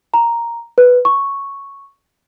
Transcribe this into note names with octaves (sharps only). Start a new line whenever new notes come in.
A#5
B4
C#6